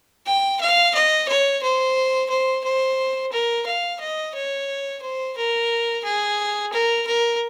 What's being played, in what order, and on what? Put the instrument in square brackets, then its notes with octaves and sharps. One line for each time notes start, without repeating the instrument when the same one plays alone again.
[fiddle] G5
F5
D#5
C#5
C5
C5
C5
A#4
F5
D#5
C#5
C5
A#4
G#4
A#4
A#4